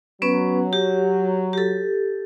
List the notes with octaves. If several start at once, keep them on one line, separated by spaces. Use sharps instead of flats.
F#3 B3 C#4 B4
G4
G4 A4